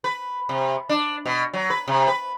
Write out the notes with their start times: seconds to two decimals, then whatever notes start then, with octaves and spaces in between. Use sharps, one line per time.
0.04 B4
0.49 C3
0.89 D4
1.26 B2
1.53 F#3
1.70 B4
1.88 C3
2.08 B4